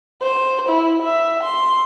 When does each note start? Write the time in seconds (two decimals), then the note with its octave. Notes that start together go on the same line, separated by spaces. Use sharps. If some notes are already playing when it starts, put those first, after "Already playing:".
0.22 C5
0.69 E4
1.03 E5
1.44 C6